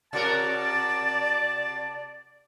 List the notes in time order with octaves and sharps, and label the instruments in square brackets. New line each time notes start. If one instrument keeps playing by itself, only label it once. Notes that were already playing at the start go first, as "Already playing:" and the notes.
[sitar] C3 F#4 A#4 [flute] D5 [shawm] A5